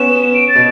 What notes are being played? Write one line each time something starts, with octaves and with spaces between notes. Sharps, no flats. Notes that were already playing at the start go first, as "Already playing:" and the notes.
Already playing: B3 C#4 E7
D7
A6
B2